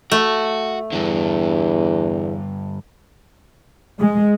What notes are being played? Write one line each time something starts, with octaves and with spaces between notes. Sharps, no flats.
A3 F#4
E2 G2 D3
G#3